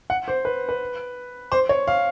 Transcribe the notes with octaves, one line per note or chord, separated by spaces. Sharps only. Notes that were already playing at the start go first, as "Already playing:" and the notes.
F#5
C5
B4
B4
C5
C#5
F5